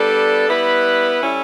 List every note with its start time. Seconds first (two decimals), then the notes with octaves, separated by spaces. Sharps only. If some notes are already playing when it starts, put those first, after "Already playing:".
Already playing: G3 B3 D4 A4
0.48 G3 B3 E4 B4
1.21 G3 C#4 E4 A4